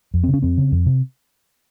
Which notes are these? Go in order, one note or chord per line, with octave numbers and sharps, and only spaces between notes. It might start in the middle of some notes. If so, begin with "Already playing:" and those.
F2
C#3 C4
C#4
F2 C4
C#3
F2
C3